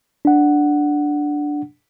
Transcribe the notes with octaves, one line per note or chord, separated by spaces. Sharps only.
D4 F#5